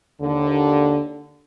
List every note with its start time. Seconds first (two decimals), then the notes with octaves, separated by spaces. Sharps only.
0.21 D#2 D3